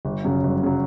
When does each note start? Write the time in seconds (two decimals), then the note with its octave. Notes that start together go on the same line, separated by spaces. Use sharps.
0.05 G1
0.24 F#2 C#3 F#3
0.43 G1
0.63 C#3 F#3